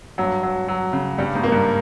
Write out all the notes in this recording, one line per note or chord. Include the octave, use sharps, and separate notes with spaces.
G2 F#3
F#3
F#3
C#3
G2 G3
G#2
A#3
G2